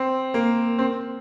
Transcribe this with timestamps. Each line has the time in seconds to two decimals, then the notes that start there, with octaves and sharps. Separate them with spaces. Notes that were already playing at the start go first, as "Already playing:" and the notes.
Already playing: C4
0.34 A#3
0.79 C4